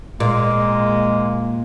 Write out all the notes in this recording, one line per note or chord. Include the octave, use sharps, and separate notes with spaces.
A#2 G#3 A#3